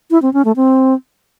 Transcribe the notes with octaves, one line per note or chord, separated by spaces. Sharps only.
E4
C4
C#4
A3
C4